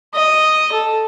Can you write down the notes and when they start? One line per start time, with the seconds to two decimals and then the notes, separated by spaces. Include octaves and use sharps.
0.15 D#5
0.72 A4